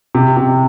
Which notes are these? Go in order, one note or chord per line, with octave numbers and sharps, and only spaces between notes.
C3
C3